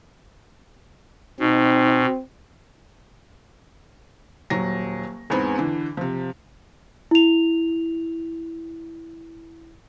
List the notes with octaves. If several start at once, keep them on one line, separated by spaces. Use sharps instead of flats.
B2 C4 D#4
D#1 F#3 A#6
E2 G#2 B3 C4
D3 E3
C3 F3
E4 F7